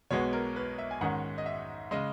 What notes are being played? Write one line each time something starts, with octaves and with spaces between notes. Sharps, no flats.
B1 B2 G#3 B3 C#5
A#4
B4
E5
G#5
G#2 D#3 G#3 C#4 F#5
D#5
E5
C#3 G#3 D#5